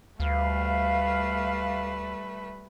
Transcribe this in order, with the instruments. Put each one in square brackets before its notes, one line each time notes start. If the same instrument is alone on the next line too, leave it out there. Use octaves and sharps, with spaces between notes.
[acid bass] D2 [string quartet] G3 A3 B4 [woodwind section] F5